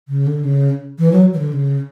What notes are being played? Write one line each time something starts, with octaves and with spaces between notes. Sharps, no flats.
C#3
D3
C#3
E3
F#3
E3
D3
C#3